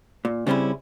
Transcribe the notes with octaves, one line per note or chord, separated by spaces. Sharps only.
A#2
C#3 G3 C4 C#4 E4